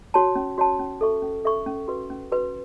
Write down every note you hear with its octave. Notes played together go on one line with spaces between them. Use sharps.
F#4 C#5 A5
C#4
F#4 C#5 A5
C#4
A4 E5 C#6
C#4
A4 E5 C#6
C#4
F#4 B4
C#4
F#4 B4